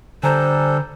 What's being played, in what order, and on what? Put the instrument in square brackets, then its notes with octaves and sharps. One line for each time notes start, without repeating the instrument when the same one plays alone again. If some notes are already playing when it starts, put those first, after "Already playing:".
[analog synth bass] D3 [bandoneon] G3 D4 A4 [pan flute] C5 [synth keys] G#5 A#5 G6